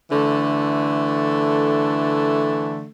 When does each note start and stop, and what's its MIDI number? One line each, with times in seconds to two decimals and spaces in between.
0.10 2.87 50
0.10 2.87 52
0.10 2.87 57